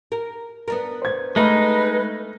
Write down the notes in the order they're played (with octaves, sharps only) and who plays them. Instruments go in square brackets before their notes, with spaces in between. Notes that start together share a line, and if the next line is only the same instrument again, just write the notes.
[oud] A#4
B3 D4 A#4
[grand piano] C5 G#6
[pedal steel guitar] G#3 D#4 [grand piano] A3 F6 [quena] B4